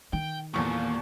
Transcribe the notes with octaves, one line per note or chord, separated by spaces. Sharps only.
D#3 G5
D#1 E2 A#2 C#6